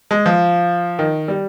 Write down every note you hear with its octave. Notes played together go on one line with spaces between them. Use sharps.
G#3
F3
D#3
G3